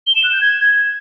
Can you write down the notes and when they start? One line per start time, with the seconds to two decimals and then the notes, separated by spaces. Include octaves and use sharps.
0.07 G7
0.15 E7
0.24 F#6
0.32 G6
0.41 G#6